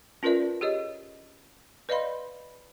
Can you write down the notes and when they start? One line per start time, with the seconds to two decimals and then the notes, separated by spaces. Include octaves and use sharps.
0.23 C#4 F4 A#4 B4 D5 E5
0.61 G4 G#4 C#5 D#5
1.89 B4 D5 D#5 F5 B5 C6